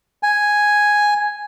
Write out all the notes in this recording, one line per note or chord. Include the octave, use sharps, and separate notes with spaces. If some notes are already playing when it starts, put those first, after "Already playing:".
G#5